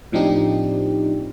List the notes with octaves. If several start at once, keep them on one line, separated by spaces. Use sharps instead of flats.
A2 F3 C4 D4 D#4 G4